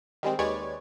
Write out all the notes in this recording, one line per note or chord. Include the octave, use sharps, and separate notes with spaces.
D#3 G3 G#3 C4
D#2 G#3 B4 C#5 D5 G#6